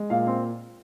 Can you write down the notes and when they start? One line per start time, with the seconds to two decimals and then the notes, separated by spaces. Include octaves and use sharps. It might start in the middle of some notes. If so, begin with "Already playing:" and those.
Already playing: G#3
0.10 A#2 F5
0.27 C4